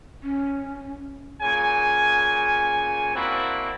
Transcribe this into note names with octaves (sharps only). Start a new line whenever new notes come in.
C#4
A#2 C#3 G#5
A#3 C4 D4 E4 F#4